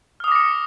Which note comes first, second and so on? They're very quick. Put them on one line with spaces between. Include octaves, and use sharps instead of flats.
F6 D#6 D6 A#6 C#7